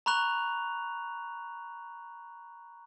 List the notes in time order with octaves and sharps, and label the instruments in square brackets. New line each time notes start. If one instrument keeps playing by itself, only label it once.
[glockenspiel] A#5 B5 C#6 F#6 F7